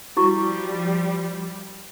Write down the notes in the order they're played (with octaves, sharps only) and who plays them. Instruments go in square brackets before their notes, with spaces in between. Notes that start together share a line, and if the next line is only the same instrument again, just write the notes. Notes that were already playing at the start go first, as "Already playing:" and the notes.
[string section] F3 G3 [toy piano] E4 F#4 C#6